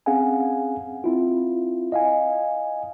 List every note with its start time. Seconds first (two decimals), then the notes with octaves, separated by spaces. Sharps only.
0.06 C4 C#4 G#4 F5 F#5 G#5
1.04 C4 E4 F4
1.92 D#5 F5 G#5